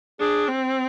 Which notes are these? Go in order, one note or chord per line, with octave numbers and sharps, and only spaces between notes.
D4 G#4
C4